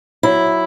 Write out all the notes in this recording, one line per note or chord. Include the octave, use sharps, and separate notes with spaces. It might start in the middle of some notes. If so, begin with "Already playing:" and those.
F#3 E4